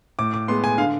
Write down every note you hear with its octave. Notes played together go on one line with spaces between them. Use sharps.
A2 D6
D6
G#3 B3 C6
G#5
D3 F5